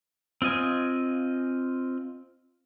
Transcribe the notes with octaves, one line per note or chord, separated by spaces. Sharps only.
C4 F4 D#5 G#5